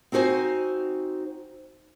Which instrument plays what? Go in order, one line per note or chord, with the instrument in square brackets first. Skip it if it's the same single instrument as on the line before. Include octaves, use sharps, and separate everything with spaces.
[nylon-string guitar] C4 D#4 F#4 C5 G#5